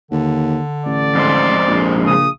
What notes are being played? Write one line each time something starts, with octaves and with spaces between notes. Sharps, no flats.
D#2 D3
A1 D5
F2 G#2 C5
A#1
C#3 D#6